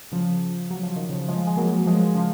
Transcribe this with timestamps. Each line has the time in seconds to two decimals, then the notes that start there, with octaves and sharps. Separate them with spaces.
0.12 C#3 F3
0.70 F#3
0.83 F3
0.96 D#3
1.09 C#3 F3
1.28 F3 G#3
1.47 G#3
1.57 F#3 A#3
1.86 F3 G#3
2.15 C#3 F3